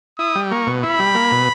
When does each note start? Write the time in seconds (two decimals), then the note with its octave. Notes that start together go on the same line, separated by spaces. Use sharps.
0.18 E4 D#6
0.35 G3
0.51 A#3 C#6
0.67 B2
0.83 E4 B5
0.99 G3
1.15 A#3
1.31 B2